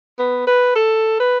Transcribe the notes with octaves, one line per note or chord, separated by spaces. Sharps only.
B3
B4
A4
B4